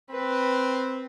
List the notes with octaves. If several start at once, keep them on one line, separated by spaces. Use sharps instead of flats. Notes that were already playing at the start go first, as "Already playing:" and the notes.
C4 B4